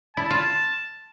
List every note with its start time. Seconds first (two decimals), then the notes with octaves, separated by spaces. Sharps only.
0.17 E4 A5
0.30 F4